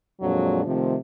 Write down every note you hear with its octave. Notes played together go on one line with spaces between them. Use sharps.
F2 A#2 F#3 G#3 D4
C3 D#3 F3 A3